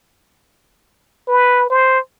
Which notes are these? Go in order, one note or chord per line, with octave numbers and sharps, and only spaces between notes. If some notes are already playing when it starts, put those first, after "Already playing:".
B4
C5